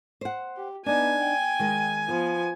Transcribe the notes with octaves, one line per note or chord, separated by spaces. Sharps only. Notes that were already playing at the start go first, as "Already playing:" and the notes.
C5 F#5
G4
B3 D4 D#4 G#5
G5
D#3 G#3
F3 B3